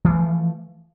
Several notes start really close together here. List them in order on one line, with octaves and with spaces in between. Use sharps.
E3 A3 F3